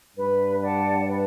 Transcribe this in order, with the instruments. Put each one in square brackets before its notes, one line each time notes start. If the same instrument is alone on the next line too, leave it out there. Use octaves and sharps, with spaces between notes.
[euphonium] G2 [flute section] B4
[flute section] D5 F#5 A5
B4